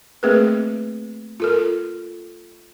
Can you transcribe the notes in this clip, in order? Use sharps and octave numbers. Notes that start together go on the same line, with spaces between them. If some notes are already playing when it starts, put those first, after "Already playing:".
A3 A#3 C4 G#4 A#4 B4
F4 A4 A#4